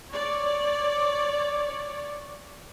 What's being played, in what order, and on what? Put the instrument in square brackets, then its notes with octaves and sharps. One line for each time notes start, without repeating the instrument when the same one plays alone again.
[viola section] C#5 D5